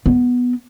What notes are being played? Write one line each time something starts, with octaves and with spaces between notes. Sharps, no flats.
B3